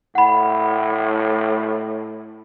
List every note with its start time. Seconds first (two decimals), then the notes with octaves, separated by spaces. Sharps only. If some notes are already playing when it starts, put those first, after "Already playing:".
0.15 A2 F#5 B5